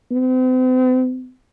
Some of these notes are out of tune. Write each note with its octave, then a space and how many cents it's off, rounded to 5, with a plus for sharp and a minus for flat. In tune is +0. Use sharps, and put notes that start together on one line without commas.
C4 -40